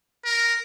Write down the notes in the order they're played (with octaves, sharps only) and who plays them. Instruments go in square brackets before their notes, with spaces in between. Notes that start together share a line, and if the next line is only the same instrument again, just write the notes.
[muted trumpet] A#4